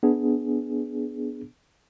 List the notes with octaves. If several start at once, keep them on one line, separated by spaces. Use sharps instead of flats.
B3 D4 G#4